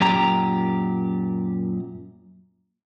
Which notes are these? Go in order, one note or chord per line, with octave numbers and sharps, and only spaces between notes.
F#2 A#2 G4 A#5